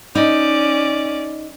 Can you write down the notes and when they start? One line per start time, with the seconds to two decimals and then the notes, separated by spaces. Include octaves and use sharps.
0.15 C#4 D#4 D5